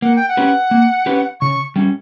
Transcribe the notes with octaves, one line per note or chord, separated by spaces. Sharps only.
A#3 F#5
G5
F#5
C#4 G4 B4
A#3
C#4 G4 B4
C#3 C#6
G3 C#4